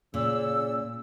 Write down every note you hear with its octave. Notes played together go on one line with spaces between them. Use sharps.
A#2 C#3 E6